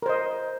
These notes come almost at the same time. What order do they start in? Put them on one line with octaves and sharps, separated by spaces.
A#4 C5 D#5